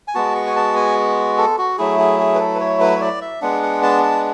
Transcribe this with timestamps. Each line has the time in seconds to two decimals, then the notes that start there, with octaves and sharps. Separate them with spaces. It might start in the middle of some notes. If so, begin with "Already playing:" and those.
0.08 G#5
0.15 G#3 B3 F#4 A5
0.35 C#6
0.47 G#5
0.56 A5
0.76 G#5
1.38 A4
1.58 F#4
1.78 F#3 A3 E4 G#4
1.99 G#4
2.19 G#4
2.35 B4
2.39 A4
2.55 B4
2.60 C#5
2.80 B4
2.96 C#5
3.01 D5
3.21 E5
3.42 G#3 B3 D4 F#5
3.63 F#5
3.83 A5
4.03 A5